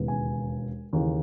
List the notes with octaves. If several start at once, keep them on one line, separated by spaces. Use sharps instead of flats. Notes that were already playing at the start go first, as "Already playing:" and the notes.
Already playing: E1 D#2 C#3 E3 B3
G#5
D#2 C#3 E3